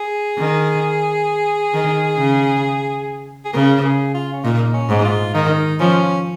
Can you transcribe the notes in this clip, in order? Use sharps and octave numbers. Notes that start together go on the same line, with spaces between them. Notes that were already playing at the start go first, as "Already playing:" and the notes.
Already playing: G#4
D#3
D#3
C#3
G#4
C#3 A#4
G#4
F4
C#4
A#2 D#4
C#4
G#2
F4
D#3 D#4
F3 C#4